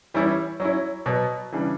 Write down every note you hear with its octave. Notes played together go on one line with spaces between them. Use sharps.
E3 G3 C#4 E4
F#3 C#4 E4
B2 F#3 B3
C#3 E3 G3 D4